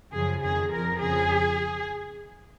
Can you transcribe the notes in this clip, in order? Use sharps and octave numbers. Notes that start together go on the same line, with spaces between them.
F#2 C#3 F3 G#4
F2 D#3 G#4
F2 F3 A#4
F2 C#3 F3 G#4